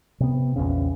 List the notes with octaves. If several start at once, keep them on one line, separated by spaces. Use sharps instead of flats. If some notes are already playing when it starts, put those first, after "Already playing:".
C3 B3
A#1 E2 C#3